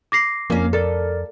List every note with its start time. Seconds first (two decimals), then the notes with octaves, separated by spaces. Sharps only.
0.12 D6 A#6 C7
0.50 F2 A#3 C#4
0.73 A4 A#4 D5